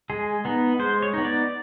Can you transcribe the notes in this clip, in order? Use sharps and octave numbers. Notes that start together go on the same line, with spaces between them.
G#3 G#4
B3 D#4
G#3 C5
C#5
B3 D#4
D5